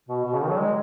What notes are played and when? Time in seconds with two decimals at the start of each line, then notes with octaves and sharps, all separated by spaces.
0.09 B2
0.25 B2
0.34 C#3
0.42 D#3
0.50 F#3
0.59 G#3